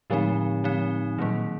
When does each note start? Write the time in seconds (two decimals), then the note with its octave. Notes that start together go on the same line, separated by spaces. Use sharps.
0.10 A2 D3 F3 G#3 C4 D#4
0.64 D3 F3 G#3 C4 D#4
1.18 A#2 D#3 F#3 A#3